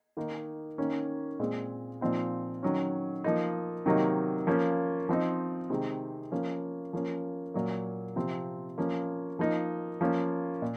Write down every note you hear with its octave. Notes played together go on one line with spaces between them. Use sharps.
D#3 A#3 D#4
D#3 A#3 C#4
A#2 G#3 C4
A#2 F3 C4 D#4
D#3 F#3 C#4
F3 A#3 D#4
C3 D#3 F#3 A#3 D#4
F3 A#3 C#4
F3 C4 D#4
C3 D#3 G#3 C4
F3 A#3 C#4
F3 A#3 C#4
A#2 F#3 A#3
C3 F3 C4
F3 A#3 C#4
F3 A#3 D#4
F3 A#3 C#4
A#2